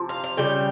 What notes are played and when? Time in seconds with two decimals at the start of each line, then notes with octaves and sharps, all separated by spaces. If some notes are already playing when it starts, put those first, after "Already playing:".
Already playing: C3 F3
0.09 F5
0.24 F5
0.37 C#3 G3 G5